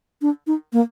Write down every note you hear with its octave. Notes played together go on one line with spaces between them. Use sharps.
D4
D#4
A#3